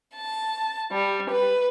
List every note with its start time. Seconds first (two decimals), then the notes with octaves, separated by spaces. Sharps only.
0.14 A5
0.92 G3
1.29 B4